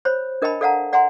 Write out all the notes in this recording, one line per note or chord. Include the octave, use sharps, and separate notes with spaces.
C5 C#5 B5
D4 A#4 D#5 G5 A5 B5
A4 D5 F5 F#5 A5 A#5
D5 F#5 G#5 A#5 C6